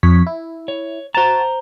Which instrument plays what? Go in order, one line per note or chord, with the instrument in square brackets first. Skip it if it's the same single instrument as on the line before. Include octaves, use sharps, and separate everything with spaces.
[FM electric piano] F2 C#5 B6
E4
[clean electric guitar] C#5
[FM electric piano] F#4 A5 [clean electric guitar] C5 A#5